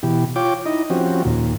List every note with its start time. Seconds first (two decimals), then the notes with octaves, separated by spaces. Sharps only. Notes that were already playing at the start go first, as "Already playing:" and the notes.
0.03 B2 E3 G4
0.36 F4 C#5 G5 D6
0.66 D#4 E4 D#5
0.90 F3 C4 C#4 F#4 G4
1.25 D#2 A#2